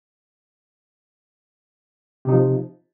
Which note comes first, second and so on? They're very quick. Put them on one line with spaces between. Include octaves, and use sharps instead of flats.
C3 D#4 F3